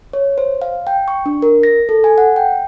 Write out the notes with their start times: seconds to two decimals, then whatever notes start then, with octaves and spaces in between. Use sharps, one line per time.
0.13 C#5
0.38 C5
0.62 F5
0.87 G5
1.08 C#6
1.26 D4
1.42 A#4
1.63 A#6
1.89 A4
2.04 G#5
2.18 F#5
2.36 G5